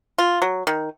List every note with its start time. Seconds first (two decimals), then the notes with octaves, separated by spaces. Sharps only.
0.18 F4
0.42 F#3
0.67 D#3